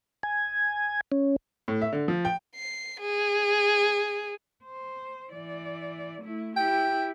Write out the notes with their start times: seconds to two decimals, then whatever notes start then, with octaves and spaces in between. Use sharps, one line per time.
0.23 G#5
1.12 C#4
1.68 A2
1.81 E5
1.93 D3
2.08 F3
2.25 G5
2.56 C7
3.00 G#4
4.64 C5
5.31 E3 D5
6.22 A3 E4
6.56 E4 G4 G5